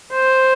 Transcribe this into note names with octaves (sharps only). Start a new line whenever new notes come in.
C5